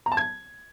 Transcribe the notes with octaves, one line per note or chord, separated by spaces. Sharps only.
A#5
A5
G#6